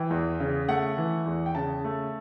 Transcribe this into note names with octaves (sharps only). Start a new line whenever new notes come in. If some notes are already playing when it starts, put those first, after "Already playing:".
Already playing: E3 G5
E2
C#3
A3 F#5
E3
E2
G5
C#3 A5
A3